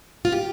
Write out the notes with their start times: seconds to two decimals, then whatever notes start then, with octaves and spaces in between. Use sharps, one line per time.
0.25 F4
0.32 G4